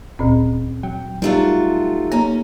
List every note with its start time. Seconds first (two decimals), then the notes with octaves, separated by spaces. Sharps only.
0.19 E1 D2 A#2 C4
0.83 F#3 G5
1.22 F#3 G3 A3 D#4 F4 G4
2.12 A#3 C#4 A#5